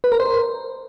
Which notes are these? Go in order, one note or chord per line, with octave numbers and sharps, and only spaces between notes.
B4
A#4
C5